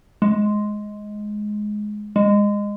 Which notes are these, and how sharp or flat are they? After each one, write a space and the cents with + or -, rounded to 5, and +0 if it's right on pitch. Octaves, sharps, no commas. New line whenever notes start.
G#3 +10
G#3 -20